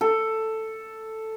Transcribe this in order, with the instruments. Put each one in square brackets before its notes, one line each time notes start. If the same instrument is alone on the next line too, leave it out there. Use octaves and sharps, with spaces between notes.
[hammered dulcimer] A4